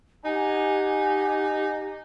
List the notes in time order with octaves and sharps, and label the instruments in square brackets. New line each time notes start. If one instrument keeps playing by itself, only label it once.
[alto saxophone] D#4 [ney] G4 [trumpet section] F#5 G#5